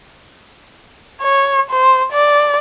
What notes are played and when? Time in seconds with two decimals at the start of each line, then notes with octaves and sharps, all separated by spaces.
1.22 C#5
1.70 C5
2.13 D5